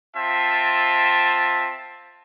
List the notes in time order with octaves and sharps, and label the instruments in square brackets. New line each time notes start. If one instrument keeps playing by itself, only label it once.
[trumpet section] C4 F4 E5 A5